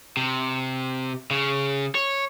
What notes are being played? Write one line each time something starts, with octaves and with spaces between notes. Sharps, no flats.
C3
C#3
C#5